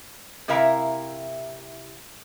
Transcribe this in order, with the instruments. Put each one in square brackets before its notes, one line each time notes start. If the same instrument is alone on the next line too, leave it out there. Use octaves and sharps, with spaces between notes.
[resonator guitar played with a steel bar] C3 E4 A#4 E5 F5 A#5